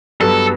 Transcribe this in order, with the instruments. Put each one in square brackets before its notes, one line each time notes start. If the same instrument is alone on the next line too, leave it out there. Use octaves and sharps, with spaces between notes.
[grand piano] G2 F#3 B3 [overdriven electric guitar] A4